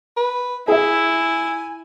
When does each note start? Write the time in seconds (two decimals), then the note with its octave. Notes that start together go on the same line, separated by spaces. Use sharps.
0.17 B4
0.68 E4 G#4 E5 G#5